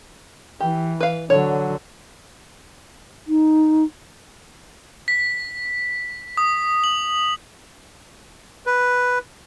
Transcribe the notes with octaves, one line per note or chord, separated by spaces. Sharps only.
E3 G4
B4 F5
D3 F#3 C#5
D#4
B6
D#6
F#7
B4